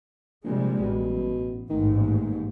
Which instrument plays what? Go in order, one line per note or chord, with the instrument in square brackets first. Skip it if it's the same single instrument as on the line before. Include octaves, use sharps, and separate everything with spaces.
[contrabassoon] A#1 [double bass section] C3 G3 G#3
[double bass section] A1 [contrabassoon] B2
[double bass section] A1 G#2 [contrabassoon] D#3
[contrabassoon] D#2